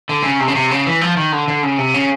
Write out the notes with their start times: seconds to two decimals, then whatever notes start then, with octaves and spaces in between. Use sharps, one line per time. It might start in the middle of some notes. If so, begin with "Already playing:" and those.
0.09 D3
0.23 C#3
0.40 C3
0.48 C#3
0.55 C3
0.71 C#3
0.86 E3
1.01 F3
1.17 D#3
1.32 D3
1.48 D3
1.63 C#3
1.78 C3
1.94 C#3